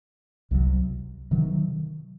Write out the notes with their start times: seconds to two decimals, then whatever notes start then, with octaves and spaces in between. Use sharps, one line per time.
0.51 C2 C3 D#3 F#3
1.31 C3 D#3 F#3